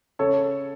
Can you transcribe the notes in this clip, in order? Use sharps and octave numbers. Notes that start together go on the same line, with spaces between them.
C#3 A4 C#5